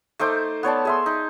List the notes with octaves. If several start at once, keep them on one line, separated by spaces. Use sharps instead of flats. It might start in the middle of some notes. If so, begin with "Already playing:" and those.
A3 D#4 C5 D6
B3 C#5 D5 A5
G#4 E5 C6
D#4